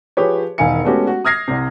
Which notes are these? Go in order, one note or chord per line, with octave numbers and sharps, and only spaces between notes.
F3 G4 G#4 B4 C#5
E1 D#3 F5 G#5 C#7
G#3 A3 B3 C#4 F#4 G4
F#4
D#6 F6 G#6 A#6 C7
C2 C3